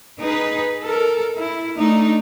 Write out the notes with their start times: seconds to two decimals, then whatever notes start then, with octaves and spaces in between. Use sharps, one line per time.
0.20 D#4 G#4 B4
0.84 A4 A#4
1.37 E4
1.79 A3 D4 D#4